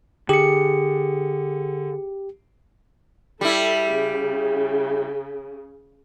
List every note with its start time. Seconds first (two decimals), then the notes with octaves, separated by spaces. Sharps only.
0.29 D3 G4 G#4 C#7
3.41 G3 E4 A4
3.90 C#3